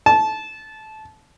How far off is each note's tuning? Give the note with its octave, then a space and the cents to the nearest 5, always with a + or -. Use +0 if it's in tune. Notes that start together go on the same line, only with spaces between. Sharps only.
A5 -20